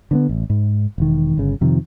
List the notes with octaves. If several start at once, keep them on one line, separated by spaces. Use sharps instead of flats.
D3 A#3 B3
A1
G#2
E1 D#3
G1 C#3
F2 C3 D#3 F3